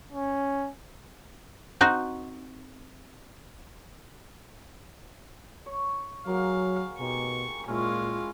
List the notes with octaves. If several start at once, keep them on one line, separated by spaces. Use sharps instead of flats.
C#4
C4 D#4 F#4
C#5
F#3 A#3 F#4 G#4 F5
B2 G#3 D#4 G4 C#6
A#2 G#3 C#4 E4 F4